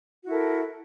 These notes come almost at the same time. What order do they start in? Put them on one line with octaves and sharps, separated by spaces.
F#4 E4 A4 A#4